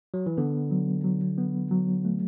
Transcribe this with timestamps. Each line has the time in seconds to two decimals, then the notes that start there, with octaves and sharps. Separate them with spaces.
0.14 F#3
0.26 E3
0.37 D3 B3
0.71 F#3
1.04 F#3
1.38 B3
1.71 F#3
2.05 A3